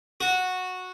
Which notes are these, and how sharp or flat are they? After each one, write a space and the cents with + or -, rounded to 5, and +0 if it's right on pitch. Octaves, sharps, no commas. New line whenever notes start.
F#4 -10